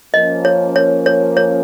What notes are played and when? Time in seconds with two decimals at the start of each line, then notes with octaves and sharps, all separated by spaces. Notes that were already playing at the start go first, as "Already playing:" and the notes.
0.14 F3 A#3 C#4 D#5
0.45 C#5
0.76 C#5
1.06 C#5
1.37 C#5